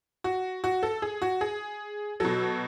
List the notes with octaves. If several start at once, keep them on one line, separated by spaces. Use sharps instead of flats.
F#4
F#4
A4
G#4
F#4
G#4
B2 F#3 A4